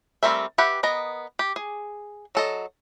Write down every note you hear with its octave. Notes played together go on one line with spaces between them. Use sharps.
G3 A3 C4 A#4 E5
G4 B4 E5 F#5
B3 A#4 D#5 A#5
G4
G#4
F#3 A4 D#5